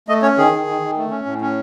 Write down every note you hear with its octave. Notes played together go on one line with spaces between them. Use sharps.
A3 D#5
C#4 C#5
D#3 G#4
D#3
D#3
D#3
A3
C#4
A2
C#4